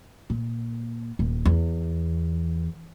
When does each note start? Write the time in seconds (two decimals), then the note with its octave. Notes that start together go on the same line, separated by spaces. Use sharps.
0.30 A#2
1.19 D#1
1.45 E2